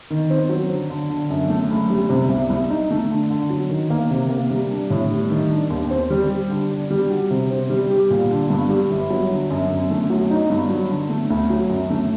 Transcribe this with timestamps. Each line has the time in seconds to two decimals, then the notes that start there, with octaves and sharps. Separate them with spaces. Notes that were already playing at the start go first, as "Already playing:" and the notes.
0.10 D#3
0.30 C4
0.49 F#3
0.70 D3
0.90 D3
1.10 D3
1.30 F#2
1.50 A3
1.70 F#1
1.90 G3
2.09 C3
2.29 C2
2.50 C2
2.70 D#4
2.91 A3
3.11 D3
3.30 D3
3.50 F#3
3.69 D#3
3.90 A#3
4.10 C3
4.30 A#3
4.50 G3
4.71 D4
4.90 A2
5.11 G3
5.30 D#3
5.50 D4
5.70 D#2
5.90 C4
6.10 G3
6.30 G4
6.50 D3
6.71 D4
6.90 G3
7.10 F#4
7.30 C3
7.50 C4
7.70 G3
7.90 G4
8.10 A#2
8.31 D3
8.50 G2
8.69 G3
8.91 G1
9.10 F#3
9.30 D3
9.50 F#2
9.70 F#2
9.90 A3
10.10 F#3
10.30 D#4
10.50 G2
10.70 F#3
10.89 D3
11.09 A3
11.30 D2
11.50 F#3
11.70 F#2
11.90 A3